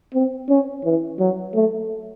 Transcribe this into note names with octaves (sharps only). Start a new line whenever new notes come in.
C4
C#4
E3
F#3
A3